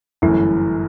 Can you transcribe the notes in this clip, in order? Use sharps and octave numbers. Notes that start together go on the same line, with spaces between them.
G1 F#2 E3 A3 E4